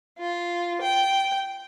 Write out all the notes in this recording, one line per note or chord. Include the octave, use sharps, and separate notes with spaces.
F4
G5